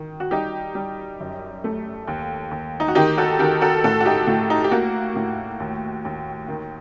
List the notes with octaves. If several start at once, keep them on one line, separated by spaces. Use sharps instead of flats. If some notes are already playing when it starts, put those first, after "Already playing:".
Already playing: D#3
F#4
G3 D#4 G4
G3
F#2
A3
D#2
D#2
D#4
F#4
D#3 D#4 G4
F#4 A4
D#3 G4 A#4
F#4 A4
A2 F#4 A4
F#4
D#4 G4
A2 F#4
D#4
G4
A#3 F#4
A2
D#2
D#2
D#3